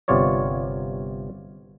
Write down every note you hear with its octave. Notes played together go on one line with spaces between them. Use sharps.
G1 C3 B3 F4 C#5 D5